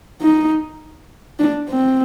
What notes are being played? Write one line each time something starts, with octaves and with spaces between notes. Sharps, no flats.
D#4
D4
C4